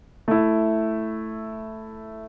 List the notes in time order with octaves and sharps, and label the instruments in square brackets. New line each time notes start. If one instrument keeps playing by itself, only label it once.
[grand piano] A3 E4